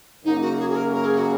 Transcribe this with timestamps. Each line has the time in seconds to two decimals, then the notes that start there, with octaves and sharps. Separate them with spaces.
0.24 F#2 C#3 F#3 A#3 C#4 D#4
0.41 F#4
0.58 G#4
0.70 G#4
0.75 A#4
0.92 A#4
1.05 G#4
1.18 F#4